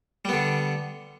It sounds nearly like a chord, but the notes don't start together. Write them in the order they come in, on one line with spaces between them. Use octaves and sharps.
G3 B3 D3